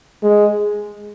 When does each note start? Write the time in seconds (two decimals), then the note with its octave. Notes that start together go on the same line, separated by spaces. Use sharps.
0.23 G#3